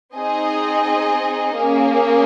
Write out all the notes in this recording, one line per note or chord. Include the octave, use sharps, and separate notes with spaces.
C4 D#4 G#4 D#5
A#3 C#4 G#4